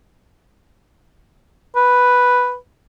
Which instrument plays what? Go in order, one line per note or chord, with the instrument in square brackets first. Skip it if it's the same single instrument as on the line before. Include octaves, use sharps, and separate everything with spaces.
[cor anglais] B4